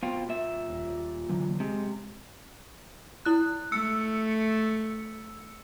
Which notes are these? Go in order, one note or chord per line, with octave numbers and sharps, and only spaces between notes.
B2 C4 F4
A#2 E5
D#1
D3 E3 F#3
C3 G#3
E4 F#6
A3 E6 C#7